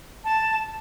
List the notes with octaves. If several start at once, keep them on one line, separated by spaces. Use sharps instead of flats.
A5